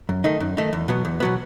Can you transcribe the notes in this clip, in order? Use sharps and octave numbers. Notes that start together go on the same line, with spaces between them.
F#2
D#3 A3 D#4
F#2
D#3 A3 D#4
E2
B2 F#3 B3
E2
B2 F#3 B3